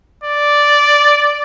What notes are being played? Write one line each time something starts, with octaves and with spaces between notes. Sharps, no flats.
D5